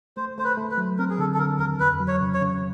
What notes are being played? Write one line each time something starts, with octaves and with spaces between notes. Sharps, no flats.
A3 C5
A3 C5
B4
A3
B4
F#3
C4 A#4
G#4
D3 A4
A4
D3 A#4
D#2 A#4
F2 B4
F#3
C#5
C#3
C#5
C#3